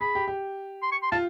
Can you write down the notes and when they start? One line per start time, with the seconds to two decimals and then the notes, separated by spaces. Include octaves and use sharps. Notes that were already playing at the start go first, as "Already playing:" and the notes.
0.01 G#4 B5
0.15 G4
0.28 G4
0.82 C6
0.92 C#6
1.03 C6
1.12 F4 A5